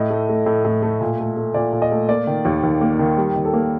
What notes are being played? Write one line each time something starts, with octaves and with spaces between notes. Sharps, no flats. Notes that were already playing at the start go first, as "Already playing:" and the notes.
Already playing: A2 D#5
A3
A3
A2
A2
A3
A#2
A3
A3
A#2 D5
A#2
D#5
A3
A#3 D5
D#3
D#2
D#2
A#3
D#3
G3
D#3
A4
A#3